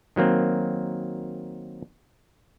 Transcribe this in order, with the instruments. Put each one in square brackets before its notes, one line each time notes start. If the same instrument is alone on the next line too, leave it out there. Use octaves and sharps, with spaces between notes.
[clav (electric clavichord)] D#3 F#3 A#3 C4